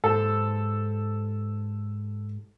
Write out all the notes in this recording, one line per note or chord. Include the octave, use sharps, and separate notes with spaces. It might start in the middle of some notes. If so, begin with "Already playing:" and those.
G#2 G4 A4 C5